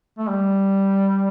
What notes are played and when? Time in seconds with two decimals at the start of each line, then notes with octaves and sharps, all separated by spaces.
0.18 A3
0.29 G3